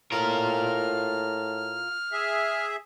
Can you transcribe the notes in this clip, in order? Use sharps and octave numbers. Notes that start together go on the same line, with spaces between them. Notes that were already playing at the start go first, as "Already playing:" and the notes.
A2 F4 A#4 F6
G#4 E5